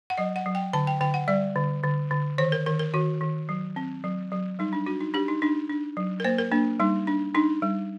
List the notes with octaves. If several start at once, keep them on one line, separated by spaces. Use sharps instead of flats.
F#5
F#3 D#5
F#5
F#3
G5
D3 A5
G5
D3 G5
F#5
G3 D5
D3
D3
D3
D#3 C5
A#4
D#3 A#4
A#4
D#3 F#4
D#3
F#3
C4
F#3
F#3
G3 D#4
D4
D4 F#4
D#4
D4 G4
D#4
D4 D#4
D4
F#3
A#4
A#3 C5
A#4
A#3 D4
G3 D#4
D4
D4 D#4
G3